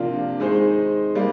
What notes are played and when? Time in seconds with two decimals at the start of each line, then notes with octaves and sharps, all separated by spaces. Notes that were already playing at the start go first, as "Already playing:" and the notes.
Already playing: C3 F3 A#3 D4 F4
0.40 D#3 G#3 D#4 G#4 C5
1.15 G3 A#3